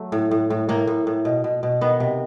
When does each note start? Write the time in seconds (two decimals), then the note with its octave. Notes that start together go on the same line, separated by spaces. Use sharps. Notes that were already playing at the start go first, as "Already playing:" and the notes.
Already playing: F#3 A3
0.12 A2
0.31 A2
0.50 A2
0.69 A2 A#3
0.87 A2
1.07 A2
1.25 B2
1.44 B2
1.63 B2
1.81 D#3 B3
2.00 C3